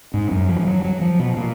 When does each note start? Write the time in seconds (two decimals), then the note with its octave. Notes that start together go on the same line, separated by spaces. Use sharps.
0.14 G#2
0.31 F#2
0.49 F3
0.59 F3
0.67 F#3
0.84 F#3
1.01 F3
1.19 B2
1.37 A#2